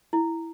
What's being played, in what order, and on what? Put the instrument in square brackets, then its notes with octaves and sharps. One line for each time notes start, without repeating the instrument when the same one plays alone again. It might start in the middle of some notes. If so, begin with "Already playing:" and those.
[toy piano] E4